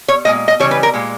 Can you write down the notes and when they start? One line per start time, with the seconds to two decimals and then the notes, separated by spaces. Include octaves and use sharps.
0.08 C#5
0.25 A#2 G#3 D#5
0.48 D#5
0.60 C#3 E3 G3 C#5
0.71 B4
0.83 A#4
0.94 A#2 G#3